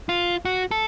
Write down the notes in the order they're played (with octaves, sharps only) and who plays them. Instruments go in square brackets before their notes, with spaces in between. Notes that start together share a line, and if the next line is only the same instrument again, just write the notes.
[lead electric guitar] F4
F#4
A4